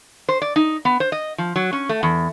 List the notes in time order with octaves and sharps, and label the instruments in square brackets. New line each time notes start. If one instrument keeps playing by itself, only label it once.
[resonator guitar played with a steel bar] C5
D5
D#4
B3
C5
D#5
F3
F#3
C#4
A3
E2